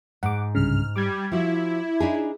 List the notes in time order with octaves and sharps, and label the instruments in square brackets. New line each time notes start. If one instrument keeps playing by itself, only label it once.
[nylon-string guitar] G#2 [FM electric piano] F#5 D6
[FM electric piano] C2 G2 C#3 [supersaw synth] F6
[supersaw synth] G3 [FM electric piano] D6 G#6
[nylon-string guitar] F3 F#4 [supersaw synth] E4
[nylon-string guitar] D4 D#4 G#4